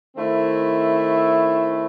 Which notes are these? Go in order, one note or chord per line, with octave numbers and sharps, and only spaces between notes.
D#3 A3 C4 E4